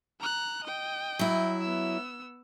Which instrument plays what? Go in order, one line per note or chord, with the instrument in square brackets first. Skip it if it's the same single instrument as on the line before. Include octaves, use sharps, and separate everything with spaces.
[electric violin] A#5 F#6
D#5 G5
[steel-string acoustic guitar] F#3 E4
[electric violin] B3 E6